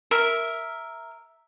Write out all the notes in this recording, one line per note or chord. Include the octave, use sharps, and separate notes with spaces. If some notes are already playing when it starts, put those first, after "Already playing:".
A#4 E5